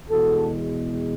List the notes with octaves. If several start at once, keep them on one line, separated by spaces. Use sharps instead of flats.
E2 B2 G#3 F#4 A4